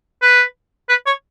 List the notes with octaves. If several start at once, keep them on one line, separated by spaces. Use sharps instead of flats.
B4
B4
C#5